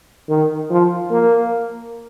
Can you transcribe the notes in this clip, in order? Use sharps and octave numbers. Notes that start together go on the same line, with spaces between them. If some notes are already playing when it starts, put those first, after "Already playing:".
D#3
F3
A#3